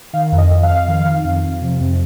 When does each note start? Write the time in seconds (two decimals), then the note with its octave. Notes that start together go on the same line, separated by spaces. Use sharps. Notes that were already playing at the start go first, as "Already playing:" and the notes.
0.13 D#3 F5
0.32 F2
0.38 D#5
0.51 F2
0.63 F5
0.69 F2
0.88 D#3
1.05 D#3
1.25 F2
1.44 F2
1.61 C3
1.81 F2